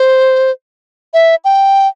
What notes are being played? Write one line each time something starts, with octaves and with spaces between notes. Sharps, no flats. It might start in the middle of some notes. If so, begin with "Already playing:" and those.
Already playing: C5
E5
G5